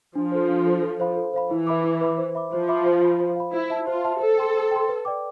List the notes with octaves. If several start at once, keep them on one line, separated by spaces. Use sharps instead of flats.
F3 D4
A4 C5
D4
A4 C5
A4
C5 F5 B5
A4
C5 F5 B5
E3 E4
B4 E5 B5 D6
E4
B4 E5 B5 D6
C5
E5 B5 D6
F3 C5
E5 B5 D6
C5
F5 B5
C5
F5 B5
E4 C5
E5 A5
F4 C5
E5 A5
A4 C5
G5 C6
C5
G5 C6
B4
D5 G5 D6